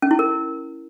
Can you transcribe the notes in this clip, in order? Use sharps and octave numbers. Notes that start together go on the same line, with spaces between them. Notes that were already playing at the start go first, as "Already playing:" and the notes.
C#4
E4
A#4